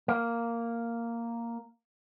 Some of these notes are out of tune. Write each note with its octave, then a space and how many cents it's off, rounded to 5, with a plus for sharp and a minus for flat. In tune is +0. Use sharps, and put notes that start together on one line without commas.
A#3 -5